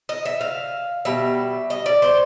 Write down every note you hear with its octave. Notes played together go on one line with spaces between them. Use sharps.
D#5
E5
F5
B2 G3 E5
D#5
D5
C5